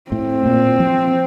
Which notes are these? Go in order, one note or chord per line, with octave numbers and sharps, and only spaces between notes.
A2 C4
A#2
F3